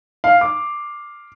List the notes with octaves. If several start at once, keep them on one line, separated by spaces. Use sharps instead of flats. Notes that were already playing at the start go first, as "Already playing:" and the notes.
F5
D6